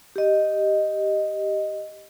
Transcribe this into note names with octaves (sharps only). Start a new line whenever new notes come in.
G4 D#5